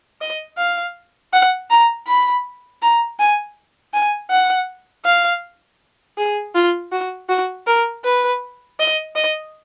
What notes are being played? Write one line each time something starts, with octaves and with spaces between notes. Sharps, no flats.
D#5
F5
F#5
A#5
B5
A#5
G#5
G#5
F#5
F5
G#4
F4
F#4
F#4
A#4
B4
D#5
D#5